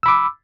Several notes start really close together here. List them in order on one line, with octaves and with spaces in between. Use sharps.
E6 B5 D6